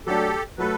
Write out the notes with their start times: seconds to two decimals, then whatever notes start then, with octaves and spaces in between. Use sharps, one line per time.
0.06 F#3 A3 D4 G4 A4
0.58 F#3 A3 A4 B4